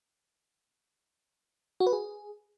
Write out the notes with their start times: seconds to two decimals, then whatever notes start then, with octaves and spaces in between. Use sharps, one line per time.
1.80 F#4
1.87 B4
1.93 G#4